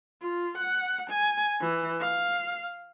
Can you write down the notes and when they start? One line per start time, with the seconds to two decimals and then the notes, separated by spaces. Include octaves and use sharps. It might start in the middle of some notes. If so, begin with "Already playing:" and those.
0.22 F4
0.58 F#5
1.10 G#5
1.61 E3
2.00 F5